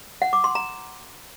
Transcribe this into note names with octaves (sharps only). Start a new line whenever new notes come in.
F#5
D6
C6
A#5